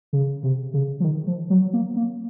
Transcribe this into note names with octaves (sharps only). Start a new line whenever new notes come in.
C#3
C3
C#3
F3
D#3
F3
F#3
A#3
A#3